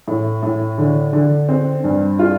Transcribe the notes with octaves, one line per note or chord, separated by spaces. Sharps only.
A2
A2
D3
D3
C4
G2
F4